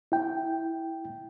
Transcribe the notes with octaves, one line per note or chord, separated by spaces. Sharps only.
E4 G5